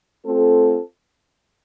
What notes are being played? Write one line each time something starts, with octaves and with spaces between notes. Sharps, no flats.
A3 C4 F4 A4